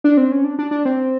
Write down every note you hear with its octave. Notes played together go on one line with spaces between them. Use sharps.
D4
C4
C#4
D4
D4
D4
C4